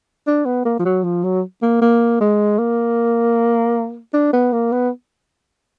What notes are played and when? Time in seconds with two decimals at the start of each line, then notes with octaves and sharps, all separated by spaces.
0.27 D4
0.46 B3
0.65 A#3
0.79 F3
0.85 F#3
1.04 F3
1.24 F#3
1.62 A#3
1.82 A#3
2.21 G#3
2.59 A#3
4.14 D4
4.33 B3
4.53 A#3
4.72 B3